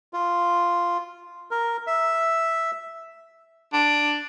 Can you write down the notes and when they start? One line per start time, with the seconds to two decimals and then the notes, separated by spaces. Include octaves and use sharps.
0.13 F4
1.51 A#4
1.87 E5
3.73 D4